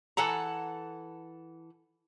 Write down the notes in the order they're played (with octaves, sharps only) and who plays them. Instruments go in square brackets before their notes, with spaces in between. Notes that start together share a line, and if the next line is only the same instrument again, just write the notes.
[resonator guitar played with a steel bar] E3 A4 F#5 A#5